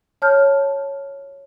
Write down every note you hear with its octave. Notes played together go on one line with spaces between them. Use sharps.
C#5 A5 F6 G6